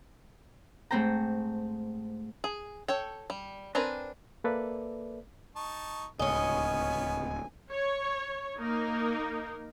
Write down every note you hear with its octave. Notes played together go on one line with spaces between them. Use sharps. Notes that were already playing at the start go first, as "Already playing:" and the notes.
G#2 A3 C4 C5 G5 A#5
G#4
A4 C#5 G5
G3
C4 D4 A#4 B4 G#5
A#3 A4 B4 D5 E5
D#4 A5 C#6
D1 C#2 B3 C#4 C#5 D#5 G#5
C#5
A#3 D#4 A#4